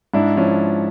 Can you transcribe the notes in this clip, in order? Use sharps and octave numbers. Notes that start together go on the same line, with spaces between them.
G#2 D4 E4
F3 C#4